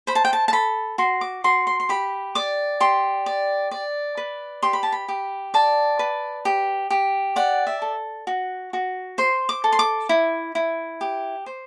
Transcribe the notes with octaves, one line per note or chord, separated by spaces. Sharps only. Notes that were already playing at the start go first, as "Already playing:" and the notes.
C5 B5
A5
G5
A5
A5
A4 B5
F#4 C6
D6
F#4 C6
C6
C6
G4 B5
D5 D6
G4 C6
D5
D5
B4
G4 C6
B5
A5
B5
G4
D5 A5
B4
G4
G4
D5 F#5
E5
A4
F#4
F#4
C5 C6
D6
A4
C6
D6
E4
E4
G4
C5